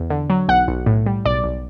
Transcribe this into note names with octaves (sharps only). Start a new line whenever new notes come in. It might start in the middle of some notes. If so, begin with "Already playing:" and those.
Already playing: E2
D3
F#3
B1 F#5
B1
A2
G3
B1 D5
B1